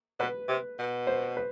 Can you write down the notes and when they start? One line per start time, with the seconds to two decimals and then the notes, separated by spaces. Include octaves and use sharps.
0.19 B2 B4
0.49 C3
0.79 B2
1.07 C5
1.37 B4